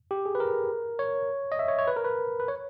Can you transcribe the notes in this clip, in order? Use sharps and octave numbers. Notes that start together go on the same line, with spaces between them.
G4
G#4
B4
A#4
C#5
D#5
E5
C#5
C#5
B4
A#4
B4
B4
C#5